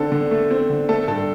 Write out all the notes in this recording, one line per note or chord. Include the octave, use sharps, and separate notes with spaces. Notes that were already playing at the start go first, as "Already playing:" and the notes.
Already playing: D3 C4 A4
D3
A3
C4
D3
A3 A4
G2 A4